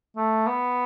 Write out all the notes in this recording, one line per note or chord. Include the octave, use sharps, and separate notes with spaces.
A3
B3